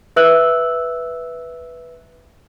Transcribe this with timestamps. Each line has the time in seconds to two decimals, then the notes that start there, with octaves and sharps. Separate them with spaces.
0.16 B4 E5 E6 F#6 F#7